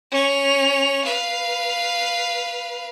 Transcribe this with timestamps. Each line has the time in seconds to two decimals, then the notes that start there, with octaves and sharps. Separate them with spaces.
0.12 C#4 F7
1.04 B4 F5